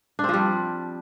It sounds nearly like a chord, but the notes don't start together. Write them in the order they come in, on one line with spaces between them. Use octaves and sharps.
D4 C4 F3 G3